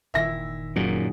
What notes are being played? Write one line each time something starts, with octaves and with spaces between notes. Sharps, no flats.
F#1 A#2 D#3 E4 E5 A#6
F#2 A#2 F#3 D#4 G#4